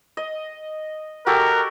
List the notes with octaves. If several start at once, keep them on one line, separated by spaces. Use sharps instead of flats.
D#5
F#4 G4 A4 A#4